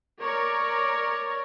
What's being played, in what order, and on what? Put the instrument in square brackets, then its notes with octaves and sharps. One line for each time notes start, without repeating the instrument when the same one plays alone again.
[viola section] A#4 C#5 D5